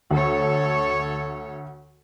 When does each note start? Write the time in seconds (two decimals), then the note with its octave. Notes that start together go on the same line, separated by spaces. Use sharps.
0.11 D2 A4 C#5